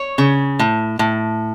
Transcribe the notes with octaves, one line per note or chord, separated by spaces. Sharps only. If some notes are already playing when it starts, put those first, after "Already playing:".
Already playing: C#5
C#3
A2
A2